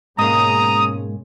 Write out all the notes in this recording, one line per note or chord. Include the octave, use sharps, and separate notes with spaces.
G#2 B2 G#3 A#3 C#4 A#5 D#6